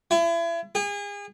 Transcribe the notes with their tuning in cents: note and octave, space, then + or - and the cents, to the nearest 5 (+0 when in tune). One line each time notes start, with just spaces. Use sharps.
E4 +35
G#4 -35